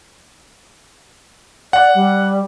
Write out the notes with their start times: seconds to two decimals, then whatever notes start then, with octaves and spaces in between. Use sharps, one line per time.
1.73 D5 F#5
1.95 G3